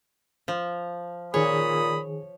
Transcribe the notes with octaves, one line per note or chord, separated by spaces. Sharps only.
F3
A#2 D#3 G#4 C#5 B5 D#6